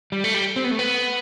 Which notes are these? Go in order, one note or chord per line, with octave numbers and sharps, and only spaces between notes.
G3
A3
G3
C4
B3
A3
B3